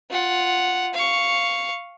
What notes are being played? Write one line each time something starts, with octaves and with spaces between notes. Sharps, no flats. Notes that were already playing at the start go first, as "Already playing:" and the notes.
F4 F#5
F5 C#6